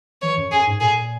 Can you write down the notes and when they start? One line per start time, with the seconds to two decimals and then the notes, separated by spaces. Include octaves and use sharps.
0.22 E3 C#5
0.38 F#2
0.52 F#2 G#4
0.67 G#2
0.80 A#2 G#4